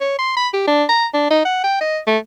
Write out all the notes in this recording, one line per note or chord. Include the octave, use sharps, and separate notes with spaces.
C#5
C6
B5
G4
D4
A#5
D4
D#4
F#5
G5
D#5
A3